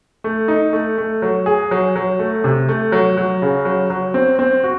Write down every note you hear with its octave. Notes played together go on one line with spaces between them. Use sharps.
A3
D#4
A3
A3
F#3
G#4
F#3
F#3
A3
C3
A3
F#3
F#3
C#3
F#3
F#3
C4
C4
F#4